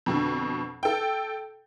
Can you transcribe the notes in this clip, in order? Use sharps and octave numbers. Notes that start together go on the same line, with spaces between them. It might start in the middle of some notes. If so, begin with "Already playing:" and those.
F2 B2 D3
A4 G5